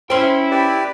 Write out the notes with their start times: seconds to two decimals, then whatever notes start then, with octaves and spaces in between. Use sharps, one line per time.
0.10 C#4 E4 C5 G5 C6
0.51 G4 B4 D5